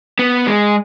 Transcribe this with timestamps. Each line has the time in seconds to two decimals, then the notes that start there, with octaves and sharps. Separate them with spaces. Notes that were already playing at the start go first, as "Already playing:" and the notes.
0.19 B3
0.47 G#3